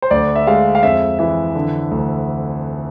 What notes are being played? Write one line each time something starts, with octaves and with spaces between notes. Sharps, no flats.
C5
D2 D5
E5
G#3 F5
F5
F2 E5
E3 E5
D3
D2